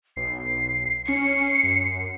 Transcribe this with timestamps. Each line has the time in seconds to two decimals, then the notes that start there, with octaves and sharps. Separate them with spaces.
0.17 B1 C7
1.08 C#4 C7 C#7
1.63 F#2